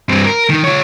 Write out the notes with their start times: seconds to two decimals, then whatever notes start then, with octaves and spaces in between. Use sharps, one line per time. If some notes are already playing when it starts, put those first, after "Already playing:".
0.09 G2 C4
0.26 A#4
0.50 D#3
0.64 F4 C#5